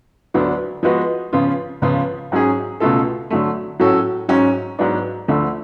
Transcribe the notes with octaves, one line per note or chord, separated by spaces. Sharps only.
D2 D3 F#3 B3 D4
F3 G#3 B3 F#4 B4
C#3 F3 B3 F4
C#2 C#3 F3 B3 F4
G#2 F#3 C#4 G#4
C#2 B2 A3 F4 A4
D3 F#3 A3
A2 F#3 C#4 F#4 A4
G#2 F#3 C#4
G#2 F#3 B3 D4
D2 D3 F3 A3